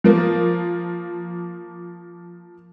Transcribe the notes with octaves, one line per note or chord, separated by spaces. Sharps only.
F3 A#3